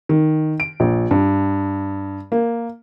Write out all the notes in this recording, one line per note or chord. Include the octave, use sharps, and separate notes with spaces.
D#3
D7
A#1
G2
A#3